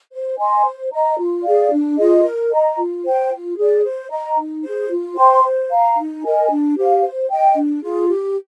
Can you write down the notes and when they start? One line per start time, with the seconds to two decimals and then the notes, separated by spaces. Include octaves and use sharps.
0.12 C5
0.38 D#5 G#5 C6
0.65 C5
0.92 D#5 A#5
1.18 F4
1.44 G#4 D5 F5
1.71 D4
1.98 F4 G#4 D#5
2.24 A#4
2.50 D#5 A#5
2.77 F4
3.04 C5 G5
3.30 F4
3.57 G#4 D5
3.84 C5
4.11 D#5 A#5
4.37 D#4
4.63 G#4 C5
4.90 F4
5.16 C5 G5 C6
5.44 C5
5.70 F5 A#5
5.96 D#4
6.23 A#4 D#5 G#5
6.49 D4
6.77 G4 C5 F5
7.02 C5
7.29 D#5 G5
7.56 D4
7.82 F4 G#4
8.08 G4